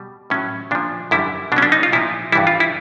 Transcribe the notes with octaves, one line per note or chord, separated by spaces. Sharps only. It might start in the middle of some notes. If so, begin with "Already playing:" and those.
Already playing: B2 G3
A2 F#3 C#4
A#2 F3 D4
F#2 D3 G3 E4
B2 F#3 C#4 D4
D4
D#4
F4
A#2 F3 E4
G2 E3 G3 E4
F4
E4